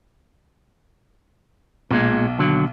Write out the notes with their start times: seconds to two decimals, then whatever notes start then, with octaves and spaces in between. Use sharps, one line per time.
1.91 B1 A#2 G#3
2.39 D#2 D3 F#3